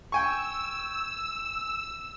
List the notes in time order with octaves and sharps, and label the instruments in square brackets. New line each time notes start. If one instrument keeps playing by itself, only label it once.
[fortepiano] G5 G#5 C#6 [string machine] E6